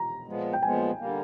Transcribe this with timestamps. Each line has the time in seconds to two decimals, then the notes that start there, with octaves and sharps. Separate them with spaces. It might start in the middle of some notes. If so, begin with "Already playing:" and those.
Already playing: A#5
0.26 A#2 F3 G#3 B3
0.53 G5
0.62 A#2 F3 G#3 B3 G#5
0.99 D3 G3 A#3